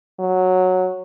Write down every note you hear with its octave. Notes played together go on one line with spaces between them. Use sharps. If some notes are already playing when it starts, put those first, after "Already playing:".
F#3